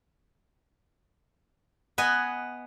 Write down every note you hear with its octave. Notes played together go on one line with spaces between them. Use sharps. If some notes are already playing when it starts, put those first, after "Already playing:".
B3 B4 D#5 G#5